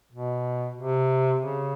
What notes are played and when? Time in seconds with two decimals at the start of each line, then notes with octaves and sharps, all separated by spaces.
0.12 B2
0.77 C3
1.42 C#3